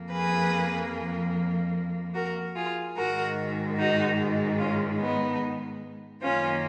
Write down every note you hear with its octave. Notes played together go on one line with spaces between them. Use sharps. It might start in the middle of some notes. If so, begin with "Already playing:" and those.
Already playing: F2 F3 A#3
G#4 B4
F#4 A#4
F4 G#4
G#2 D#3 G#3 F#4 A#4
D#4 F#4
C#4 F4
B3 D#4
F#2 D#3 A#3 C#4 F4